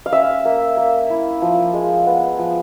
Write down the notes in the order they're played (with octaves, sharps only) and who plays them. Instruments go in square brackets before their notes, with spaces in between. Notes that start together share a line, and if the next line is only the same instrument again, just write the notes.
[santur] F5
C#4 E5
A#3
A#3
E4
F3
G#3
B3
F3